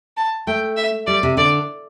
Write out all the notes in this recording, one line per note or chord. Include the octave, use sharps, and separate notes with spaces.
A5
A3 G5
E5
G3 D5
C3
D3 D5